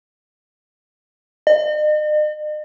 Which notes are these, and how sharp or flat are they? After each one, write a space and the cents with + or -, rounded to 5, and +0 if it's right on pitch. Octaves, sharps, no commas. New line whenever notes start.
D#5 -45